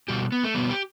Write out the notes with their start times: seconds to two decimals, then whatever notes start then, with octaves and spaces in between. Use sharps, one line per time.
0.08 B2 G3 G4
0.32 B3
0.43 A3
0.55 B2 G3 B3
0.70 G4